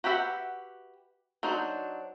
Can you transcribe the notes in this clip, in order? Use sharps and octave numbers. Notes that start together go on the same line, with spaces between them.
F#4 G4 B4 E5 F#5
F#3 D4 D#4 C5